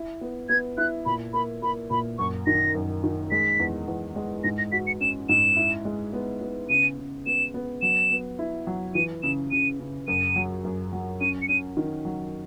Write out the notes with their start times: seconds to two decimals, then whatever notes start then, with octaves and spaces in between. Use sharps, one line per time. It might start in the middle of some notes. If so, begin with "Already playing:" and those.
Already playing: E4
0.21 B3
0.49 B3 G#6
0.77 E4 F#6
1.06 A#2 B5
1.33 A#3 B5
1.62 A#3 B5
1.90 A#2 B5
2.18 F#2 C#6
2.46 D#3 A#6
2.75 F#2
3.04 D#3
3.31 G#3 B6
3.59 E2
3.88 E2
4.16 G#3
4.44 G#2 A#6
4.58 A#6
4.72 F#4 B6
4.87 C#7
5.01 C#4 E7
5.29 G#2 E7
5.56 E4
5.85 G#3
6.13 B3
6.41 B3
6.69 C#3 D#7
6.98 C#3
7.26 B3 E7
7.54 B3
7.82 F#3 E7
8.11 B3
8.39 E4
8.67 F#3
8.95 E3 D#7
9.23 C#3 E7
9.51 C#3 D#7
9.80 C#3
10.08 F#2 D#7
10.36 F#3
10.65 F#2
10.93 F#3
11.21 C#4 D#7
11.42 C#7
11.49 C#4 D#7
11.77 D#3
12.05 F#3